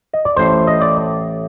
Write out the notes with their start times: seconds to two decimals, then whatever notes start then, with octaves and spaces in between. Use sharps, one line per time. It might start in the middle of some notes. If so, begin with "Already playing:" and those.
0.13 D#5
0.25 D5
0.36 A1 A2 C5
0.67 D#5
0.81 D5